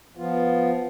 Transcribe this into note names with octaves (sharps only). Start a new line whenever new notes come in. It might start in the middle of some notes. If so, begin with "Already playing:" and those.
F3 B3 F4